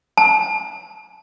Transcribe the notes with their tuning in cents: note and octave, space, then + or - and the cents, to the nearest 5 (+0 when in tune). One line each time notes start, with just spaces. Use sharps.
A5 -25